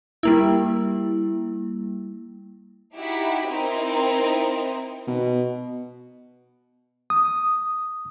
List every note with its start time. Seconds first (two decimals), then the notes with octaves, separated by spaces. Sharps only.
0.23 G3 A#3 E4
2.95 D#4 E4 F#4 G4 B5
3.48 C4 D#4 E4 A#4
5.07 B2
7.10 D#6